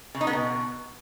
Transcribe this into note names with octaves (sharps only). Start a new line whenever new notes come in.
C#3
D#4
B3
B2